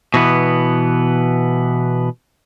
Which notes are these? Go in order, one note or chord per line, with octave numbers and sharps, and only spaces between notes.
B2 E3 B3